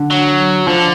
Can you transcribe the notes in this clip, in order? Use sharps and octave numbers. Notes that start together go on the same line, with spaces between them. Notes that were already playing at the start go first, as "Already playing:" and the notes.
Already playing: D3
F#3
D3 F3